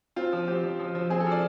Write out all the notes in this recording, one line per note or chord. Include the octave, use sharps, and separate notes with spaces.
C4 F4
F3
C4 G4
F3
F3
F3
C4 G#4
A4
F3
D5